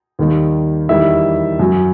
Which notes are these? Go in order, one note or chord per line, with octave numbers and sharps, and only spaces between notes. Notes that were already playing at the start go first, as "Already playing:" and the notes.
D#2 D#3 G3
E2 D#3 G3 E4 E5
F#2 F#3